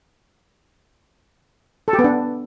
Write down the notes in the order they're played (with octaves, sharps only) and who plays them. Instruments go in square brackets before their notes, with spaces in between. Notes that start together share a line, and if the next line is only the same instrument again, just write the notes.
[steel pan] A4
G4
B3
D4